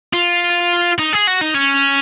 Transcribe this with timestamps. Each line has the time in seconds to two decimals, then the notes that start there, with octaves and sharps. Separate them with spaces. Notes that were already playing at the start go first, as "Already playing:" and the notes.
0.13 F4
0.99 D#4
1.13 G#4
1.27 F#4
1.41 D#4
1.54 C#4